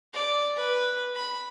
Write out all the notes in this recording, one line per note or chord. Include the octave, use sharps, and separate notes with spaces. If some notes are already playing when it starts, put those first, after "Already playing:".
D5
B4
B5